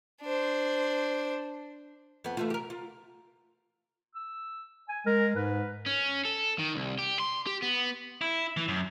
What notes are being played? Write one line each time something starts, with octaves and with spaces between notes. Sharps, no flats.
D4 C5
F2 B3
E3 A3 F4
G4 A#4
F4
E6
G#5
G#3 A#4
G#2 B4
C#4
A4
D#3
C2
G4
C6
G4
B3
E4
E3
F#2